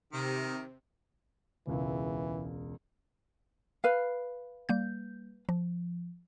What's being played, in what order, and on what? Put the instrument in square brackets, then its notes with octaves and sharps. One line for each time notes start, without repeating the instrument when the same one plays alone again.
[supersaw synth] C3 [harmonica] D#3
[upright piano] E1 C#2 [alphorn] E3
[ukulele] B4 F5
[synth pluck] G3 A#3 G6
F3